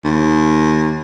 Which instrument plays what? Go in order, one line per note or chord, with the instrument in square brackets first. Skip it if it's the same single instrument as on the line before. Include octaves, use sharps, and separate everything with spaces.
[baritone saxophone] D#2